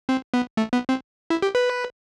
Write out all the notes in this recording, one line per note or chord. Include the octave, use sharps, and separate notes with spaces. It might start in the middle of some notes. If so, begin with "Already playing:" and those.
C4
B3
A3
B3
C4
E4
G4
B4